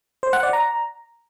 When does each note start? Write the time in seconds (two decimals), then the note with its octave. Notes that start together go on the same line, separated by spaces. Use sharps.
0.23 C5
0.33 F#5
0.43 D5
0.53 A#5